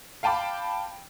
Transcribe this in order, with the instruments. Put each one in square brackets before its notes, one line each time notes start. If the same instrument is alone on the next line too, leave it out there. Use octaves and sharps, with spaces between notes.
[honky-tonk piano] F5 G5 A5 B5 D6